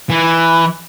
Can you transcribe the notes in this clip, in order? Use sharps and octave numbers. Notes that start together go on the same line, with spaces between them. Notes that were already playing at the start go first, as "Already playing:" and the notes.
E3